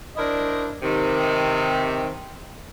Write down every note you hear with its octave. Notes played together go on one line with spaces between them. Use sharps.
D4 E4 A#4 C5 D5 D#5
C3 D#3